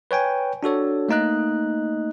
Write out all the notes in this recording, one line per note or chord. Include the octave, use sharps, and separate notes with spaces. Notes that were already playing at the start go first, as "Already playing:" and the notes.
B4 C#5 G5 G#5
D4 F#4 A4 C#5
A3 A#3 D#4 D#5 F#6